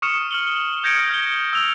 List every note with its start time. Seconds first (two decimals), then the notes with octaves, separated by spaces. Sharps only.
0.02 C#6 D#6 F6 C#7 E7
0.31 F6 F#7 G7
0.83 D#6 G6 G#6 A#6 C#7 D7
0.97 F6
1.10 F6 G6 A#6 G7
1.53 E6 F7